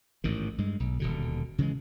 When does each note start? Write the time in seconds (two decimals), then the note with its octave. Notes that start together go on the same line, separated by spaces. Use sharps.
0.24 A1 G#2 D#3
0.58 G2 G#3
0.80 B1
1.00 D#1 B2 D3
1.58 C#3 E3 G#3